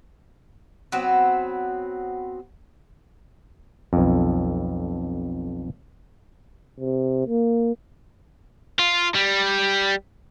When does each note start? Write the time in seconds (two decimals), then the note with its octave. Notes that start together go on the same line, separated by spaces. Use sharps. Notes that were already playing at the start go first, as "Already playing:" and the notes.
0.92 F#3 B3 C4
3.93 B1 F2
6.80 C3
7.27 A#3
8.79 F4
9.15 G3